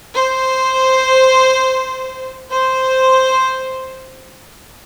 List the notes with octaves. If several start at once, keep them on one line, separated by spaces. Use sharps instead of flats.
C5
C5